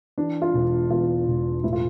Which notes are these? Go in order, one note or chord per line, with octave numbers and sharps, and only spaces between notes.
E3 D4
F4
E1
E2 F4
E1
A2 E4
F4